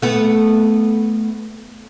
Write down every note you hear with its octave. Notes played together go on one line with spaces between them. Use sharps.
A3 B3